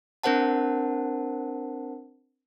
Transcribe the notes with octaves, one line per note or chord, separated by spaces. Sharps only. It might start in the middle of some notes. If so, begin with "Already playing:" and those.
C4 D4 A#4 C5 F#5 A5